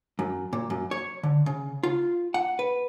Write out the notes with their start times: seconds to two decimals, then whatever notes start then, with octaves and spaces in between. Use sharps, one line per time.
0.19 F#2
0.53 A#2
0.70 F#2
0.91 C#5
1.23 D3
1.46 C#3
1.83 F4
2.34 F#5
2.59 B4